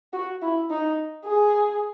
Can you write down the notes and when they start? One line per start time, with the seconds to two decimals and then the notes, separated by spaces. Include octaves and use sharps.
0.13 F#4
0.42 E4
0.70 D#4
1.25 G#4